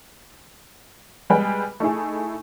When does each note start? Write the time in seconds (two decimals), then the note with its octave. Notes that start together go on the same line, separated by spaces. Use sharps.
1.30 G3 G#3 B3 G#4 B4 G5
1.80 A3 D#4 E4 G#4